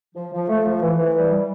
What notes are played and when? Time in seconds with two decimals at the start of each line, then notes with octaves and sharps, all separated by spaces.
0.15 F3
0.33 F3
0.48 A3
0.65 F3
0.82 E3
0.99 E3
1.15 G3
1.31 G3